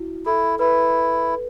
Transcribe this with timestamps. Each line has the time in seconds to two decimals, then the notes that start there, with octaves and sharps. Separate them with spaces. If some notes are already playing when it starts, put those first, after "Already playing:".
Already playing: E4 F#4
0.26 E4 A4
0.59 E4 B4